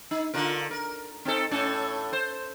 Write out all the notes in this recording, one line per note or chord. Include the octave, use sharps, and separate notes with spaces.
D#4
D3 F4 A#4
A#4
C4 D#4 A4
A2 C#4 A4
C5